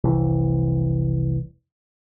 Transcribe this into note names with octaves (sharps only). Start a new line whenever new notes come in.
F1 C2 E3